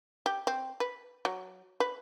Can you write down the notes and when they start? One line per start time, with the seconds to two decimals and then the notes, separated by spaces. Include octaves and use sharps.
0.26 G4
0.47 C4
0.80 B4
1.25 F#3
1.80 B4